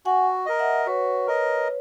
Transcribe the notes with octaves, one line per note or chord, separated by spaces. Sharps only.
F#4 F#5 G#5
A#4 D#5
E5 F#5
F#4 B4 C#5
A#4 D#5